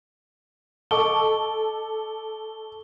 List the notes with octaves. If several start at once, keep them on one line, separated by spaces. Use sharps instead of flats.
A4 D#5 A5 C#6 D6 G7